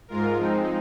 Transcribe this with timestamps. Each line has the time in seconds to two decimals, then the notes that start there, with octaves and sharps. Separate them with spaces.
0.08 G#2 G#3 F4 A#4
0.37 F3 G#3 C4 D#4